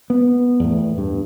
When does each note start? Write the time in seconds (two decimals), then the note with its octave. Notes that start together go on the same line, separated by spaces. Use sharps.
0.10 B3
0.60 E2 A2
0.98 G2